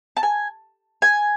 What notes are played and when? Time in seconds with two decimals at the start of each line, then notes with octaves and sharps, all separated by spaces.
0.17 A5
0.23 G#5
1.02 G#5